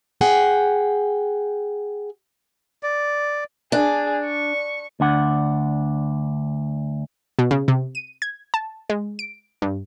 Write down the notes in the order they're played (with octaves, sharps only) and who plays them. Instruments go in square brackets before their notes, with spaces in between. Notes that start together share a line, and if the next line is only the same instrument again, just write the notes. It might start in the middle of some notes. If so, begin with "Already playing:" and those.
[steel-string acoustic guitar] G#4 F#5 G5
[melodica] D5
[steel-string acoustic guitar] D4 [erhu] G#4
[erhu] C#6
[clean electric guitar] D2 D4 F#5
[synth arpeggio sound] B2
C#3
C3
D#7
G#6
A5
G#3
D7
G2